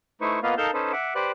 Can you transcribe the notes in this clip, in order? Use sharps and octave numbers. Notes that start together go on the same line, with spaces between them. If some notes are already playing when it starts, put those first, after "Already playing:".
A3 D#4 E4 B4 C5 C#6
A#3 B3 F4 B4 D#5 F5
D#4 A4 A#4 F5 A5 G6
C#4 D#4 A4 B4 C5
E5 F#5 D6
G4 B4 C5 D5 F#6